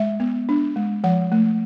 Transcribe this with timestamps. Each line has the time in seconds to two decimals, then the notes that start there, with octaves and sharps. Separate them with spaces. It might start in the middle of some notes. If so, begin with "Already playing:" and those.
Already playing: G#3 E5
0.20 B3
0.49 D4
0.76 G#3
1.04 F3 F#5
1.32 A3